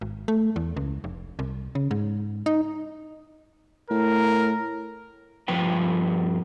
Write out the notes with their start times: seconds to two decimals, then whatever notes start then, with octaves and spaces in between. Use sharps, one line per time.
0.01 G#1
0.28 A3
0.56 E2
0.77 C#2
1.04 F1
1.39 C2
1.75 C#3
1.91 G#2
2.46 D#4
3.90 A2 A#4
5.48 G2 F3 F4 B4 G5